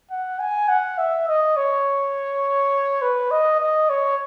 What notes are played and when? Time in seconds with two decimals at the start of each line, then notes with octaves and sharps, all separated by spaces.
0.11 F#5
0.39 G#5
0.68 F#5
0.98 E5
1.27 D#5
1.57 C#5
3.02 B4
3.31 D#5
3.60 D#5
3.90 C#5